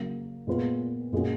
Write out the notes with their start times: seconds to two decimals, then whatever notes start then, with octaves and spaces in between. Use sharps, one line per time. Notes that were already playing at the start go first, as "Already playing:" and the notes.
Already playing: C#3 F#3 A#3
0.47 A#2 G#3 B3 F4 B4
1.13 A#2 G#3 C#4 F#4